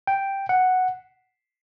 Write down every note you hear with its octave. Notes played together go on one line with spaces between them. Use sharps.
G5
F#5